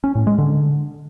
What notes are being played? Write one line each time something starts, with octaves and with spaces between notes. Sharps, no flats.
C#4
A2
G#3
D3